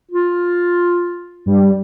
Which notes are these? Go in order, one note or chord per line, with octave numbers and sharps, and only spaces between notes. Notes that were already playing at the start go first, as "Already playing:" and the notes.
F4
G2 G3